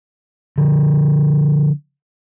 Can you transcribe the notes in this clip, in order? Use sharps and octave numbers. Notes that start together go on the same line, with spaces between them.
D3 F3